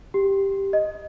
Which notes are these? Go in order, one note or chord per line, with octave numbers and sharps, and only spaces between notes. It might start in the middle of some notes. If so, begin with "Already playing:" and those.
G4
D#5